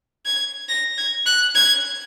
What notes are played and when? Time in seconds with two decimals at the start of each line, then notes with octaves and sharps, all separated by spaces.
0.26 G#6
0.69 A#6
0.98 G#6
1.26 F#6
1.55 G#6